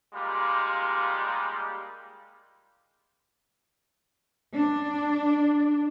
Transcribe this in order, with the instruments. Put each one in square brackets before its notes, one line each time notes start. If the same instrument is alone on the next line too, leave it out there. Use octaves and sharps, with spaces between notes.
[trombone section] G3 G#3 A#3 D#4 F4 G4
[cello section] D4